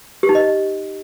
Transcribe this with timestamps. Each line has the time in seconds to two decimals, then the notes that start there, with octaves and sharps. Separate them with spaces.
0.23 G4
0.29 D#4
0.35 D#5